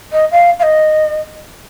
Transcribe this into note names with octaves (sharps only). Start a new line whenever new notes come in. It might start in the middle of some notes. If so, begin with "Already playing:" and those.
D#5
F5
F5
D#5